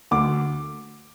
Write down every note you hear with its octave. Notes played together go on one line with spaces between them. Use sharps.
D2 D6